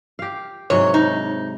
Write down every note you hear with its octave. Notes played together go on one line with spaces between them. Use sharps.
G4 F5
G#2 C3 F#3 C#5
D#4